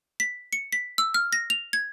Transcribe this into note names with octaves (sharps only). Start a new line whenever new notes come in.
B6
C#7
B6
E6
F6
A#6
F7
G#6